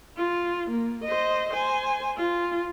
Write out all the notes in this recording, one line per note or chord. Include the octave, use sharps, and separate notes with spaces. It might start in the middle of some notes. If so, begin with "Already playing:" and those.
F4
A#3
C5 D#5
C5 G#5
F4